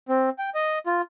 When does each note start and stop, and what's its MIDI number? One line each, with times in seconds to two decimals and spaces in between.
0.09 0.30 60
0.38 0.50 79
0.55 0.79 75
0.86 1.01 65